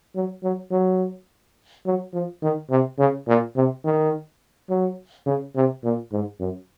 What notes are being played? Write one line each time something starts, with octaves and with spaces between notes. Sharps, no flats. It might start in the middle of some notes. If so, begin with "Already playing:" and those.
F#3
F#3
F#3
F#3
F3
D#3
C3
C#3
A#2
C3
D#3
F#3
C#3
C3
A#2
G#2
F#2